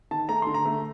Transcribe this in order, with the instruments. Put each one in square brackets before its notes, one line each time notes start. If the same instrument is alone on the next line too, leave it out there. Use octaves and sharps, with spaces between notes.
[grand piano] D#3 A5
A3 A#5
D3 C6
A#5
A3